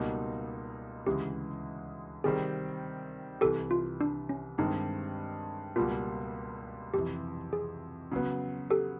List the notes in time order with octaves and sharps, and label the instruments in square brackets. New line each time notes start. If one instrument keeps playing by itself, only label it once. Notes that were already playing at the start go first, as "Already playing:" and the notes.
Already playing: [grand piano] C#2 B2 G3 A#3 D#4
[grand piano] D2 C#3 E3 G#3 [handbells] G4
[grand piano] C3 D#3 G3 C4 [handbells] G#4
[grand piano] C2 C3 E3 [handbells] G4 A4
[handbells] F4
D4
C#4
[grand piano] G2 D#3 G#3 C4 [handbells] D#4
[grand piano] C#2 B2 G3 A#3 [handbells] F4
[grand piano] F2 C3 E3 [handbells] G4
[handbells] G#4
[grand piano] C#3 F#3 B3
[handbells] G4 A4